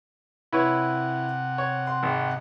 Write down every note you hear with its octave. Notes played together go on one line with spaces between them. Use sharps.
C3 E4 B4 C#5 F#5
C#5
C6
G#1